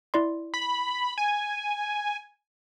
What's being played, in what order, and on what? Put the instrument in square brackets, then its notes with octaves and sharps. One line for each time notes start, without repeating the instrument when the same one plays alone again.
[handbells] E4 D5 C6
[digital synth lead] B5
G#5